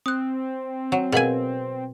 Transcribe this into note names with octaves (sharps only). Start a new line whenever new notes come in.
C4 D#6 F#6
F#3
B2 G#4 A#4 F5 G#5